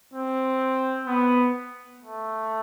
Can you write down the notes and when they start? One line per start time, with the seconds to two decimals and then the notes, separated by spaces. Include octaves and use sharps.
0.14 C4
1.07 B3
2.00 A3